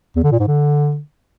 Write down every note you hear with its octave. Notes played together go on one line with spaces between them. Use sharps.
E2
D3
A#2
G#2
D3